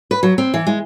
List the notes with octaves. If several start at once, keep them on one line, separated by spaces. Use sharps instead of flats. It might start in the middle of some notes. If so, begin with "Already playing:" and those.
B4
F#3
C4
E3
G#3